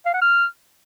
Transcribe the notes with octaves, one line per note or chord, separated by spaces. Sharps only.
F5
F#5
F6